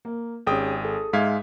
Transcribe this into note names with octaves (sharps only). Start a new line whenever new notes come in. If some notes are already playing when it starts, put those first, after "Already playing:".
A#3
G#1 C#4 G4 G#4 G5 D#6
G#4 A4
G#2 G#3 E5 F5 G#6 B6